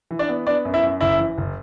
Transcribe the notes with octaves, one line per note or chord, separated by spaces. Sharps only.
E3
D4 D5
B3
B3 D4 D5
F#2
E4 E5
F#2
F#1 E4 E5
E3
F#1